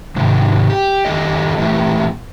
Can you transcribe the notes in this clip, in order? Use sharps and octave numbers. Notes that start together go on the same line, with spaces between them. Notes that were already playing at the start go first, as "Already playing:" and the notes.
G#2 C3 D#3
G4
F2 D#3 G4 A4 D#5
A#2 E3 A3 G4